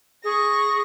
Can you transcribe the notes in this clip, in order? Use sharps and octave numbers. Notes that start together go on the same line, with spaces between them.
G#4 C#6 A#6